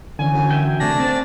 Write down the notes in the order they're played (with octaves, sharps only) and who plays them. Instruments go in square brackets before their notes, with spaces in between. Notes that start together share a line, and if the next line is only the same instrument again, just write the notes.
[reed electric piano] D3 E3 C#4 [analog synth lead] G#5
[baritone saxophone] F#2
[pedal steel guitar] E5 G5
[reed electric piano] C3 A3 [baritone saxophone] D4 [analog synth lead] A#6
[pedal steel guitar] C4 [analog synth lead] A6